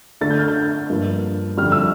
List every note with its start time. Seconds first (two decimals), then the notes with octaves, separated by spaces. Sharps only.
0.21 D3 A3 D4 A6
0.30 G6
0.39 F6
0.48 G6
0.90 G2 F3 A#3
1.57 F2 D3 G3 F6
1.72 E6